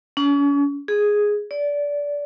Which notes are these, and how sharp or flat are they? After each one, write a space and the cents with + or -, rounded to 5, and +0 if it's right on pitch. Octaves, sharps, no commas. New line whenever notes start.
C#4 +40
G#4 +0
D5 -20